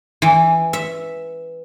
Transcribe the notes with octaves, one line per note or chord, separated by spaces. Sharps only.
E3
E5